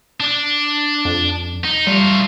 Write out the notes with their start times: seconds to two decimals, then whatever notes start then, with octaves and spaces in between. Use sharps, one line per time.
0.20 D4
1.05 F2
1.65 D#4
1.87 G3 A3 F4